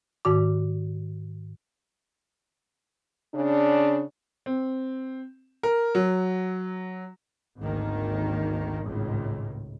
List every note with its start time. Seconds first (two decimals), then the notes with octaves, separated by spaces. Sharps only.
0.25 G#2 D#3 F#4 D6
3.34 C#3 D4
4.46 C4
5.63 A#4
5.95 F#3
7.60 G#1 D2 D#3 A#3
8.83 G#1 C#2 A2 D#3